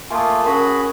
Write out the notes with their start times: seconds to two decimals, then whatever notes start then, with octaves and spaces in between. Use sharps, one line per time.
0.11 A3 A#3 F4 G#5 A5 D#6
0.46 C#4 F#4 G#4 A#4 B5